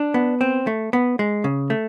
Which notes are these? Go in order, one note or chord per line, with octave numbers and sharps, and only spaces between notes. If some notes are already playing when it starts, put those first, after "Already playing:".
Already playing: D4
B3
C4
A3
B3
G#3
C#3
A3